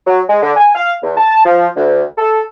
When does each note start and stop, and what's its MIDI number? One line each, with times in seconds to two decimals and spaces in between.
0.07 0.21 54
0.29 0.40 56
0.42 0.52 50
0.56 0.71 80
0.75 0.93 77
1.03 1.13 40
1.17 1.44 81
1.45 1.67 53
1.75 2.03 38
2.18 2.42 69